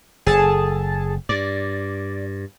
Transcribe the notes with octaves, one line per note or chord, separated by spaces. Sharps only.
F#1 G#4 A4 A5
G2 D5